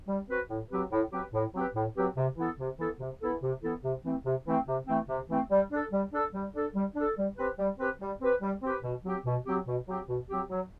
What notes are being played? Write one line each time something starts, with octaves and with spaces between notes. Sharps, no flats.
G3
C4 F#4 B4
A2
F#3 C4 G4 B4
A2
F#3 C4 G4 B4
A2
F#3 C4 G4 B4
A2
F#3 C4 G4 B4
C3
E3 B3 E4 A4
C3
E3 B3 E4 A4
C3
E3 B3 E4 A4
C3
E3 B3 E4 A4
C3
E3 A3 C4
C3
E3 A3 C4
C3
E3 A3 C4
C3
E3 A3 C4
G3
D4 A4
G3
D4 A4
G3
D4 A4
G3
D4 A4
G3
C4 G4 B4
G3
C4 G4 B4
G3
C4 G4 B4
G3
C4 G4 B4
B2
F#3 C4 G4
B2
F#3 C4 G4
B2
F#3 C4 G4
B2
F#3 C4 G4
F#3